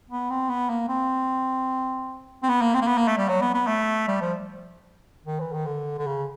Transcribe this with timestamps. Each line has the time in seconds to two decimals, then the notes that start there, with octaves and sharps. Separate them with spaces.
0.10 B3
0.30 C4
0.49 B3
0.69 A#3
0.89 C4
2.43 C4
2.49 B3
2.61 A#3
2.74 C4
2.81 A#3
2.87 B3
2.97 A#3
3.08 A3
3.17 G3
3.28 F#3
3.41 B3
3.54 B3
3.67 A3
4.08 G3
4.21 F3
5.26 D#3
5.40 E3
5.53 D#3
5.66 D3
5.98 D3
6.07 C#3